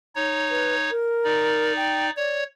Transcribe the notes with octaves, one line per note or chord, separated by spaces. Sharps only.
D#4 C#5
B4
A#4
D#4 D5
G5
C#5 D5